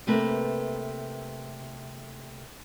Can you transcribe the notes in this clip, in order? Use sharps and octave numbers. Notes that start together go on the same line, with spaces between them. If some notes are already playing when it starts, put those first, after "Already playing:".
C3 A3 A#3 B4